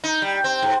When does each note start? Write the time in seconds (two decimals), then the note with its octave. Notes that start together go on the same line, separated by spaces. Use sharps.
0.04 D#4
0.22 G3
0.44 C4
0.62 G#2